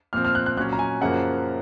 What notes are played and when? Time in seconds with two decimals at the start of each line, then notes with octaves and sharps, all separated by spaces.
0.13 A#2 F3 C4 F6
0.25 F6
0.35 F#6
0.46 F#6
0.57 A#2 F#3 C#4 F#6
0.73 A#5
0.79 G#5
1.01 F#2 C#3 F3 A#3 F#5